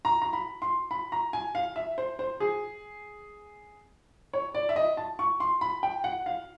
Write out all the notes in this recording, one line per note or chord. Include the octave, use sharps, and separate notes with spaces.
A#5
A#5
B5
C6
B5
A#5
G#5
F5
E5
C5
C5
G#4
C#5
D5
E5
D#5
A5
C#6
C6
B5
G5
F#5
F5